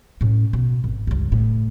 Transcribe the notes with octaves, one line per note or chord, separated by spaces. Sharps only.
A2 C#4
B2
G#1
C#2 G2
A2